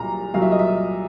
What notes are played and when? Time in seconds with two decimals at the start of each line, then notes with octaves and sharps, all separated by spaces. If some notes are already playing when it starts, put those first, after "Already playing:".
Already playing: C2 A#2 F#3 A#5
0.34 C2 A#2 F#3 F5
0.42 E5
0.51 D#5
0.59 E5